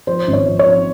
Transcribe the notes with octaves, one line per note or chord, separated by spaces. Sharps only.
F3 C5
G#1
C#5
F3
C#5
F3